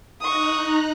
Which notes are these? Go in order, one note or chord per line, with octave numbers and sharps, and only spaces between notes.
D#4 A#5 C#6 D#6 F#6